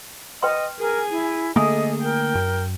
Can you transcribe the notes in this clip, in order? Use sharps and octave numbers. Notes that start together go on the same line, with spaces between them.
B4 D#5 G5 C6
G#4 A#4 G#5
E4
D3 A3 A#3 G#4 A4 D#5 G#5 D#6
A#4 G5
F#2